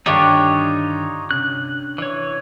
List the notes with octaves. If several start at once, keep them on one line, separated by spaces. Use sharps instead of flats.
G2 D3 D#3 D4 D#4 F4 G4 C#5
C3 C#4 F#6
E3 C#5 D5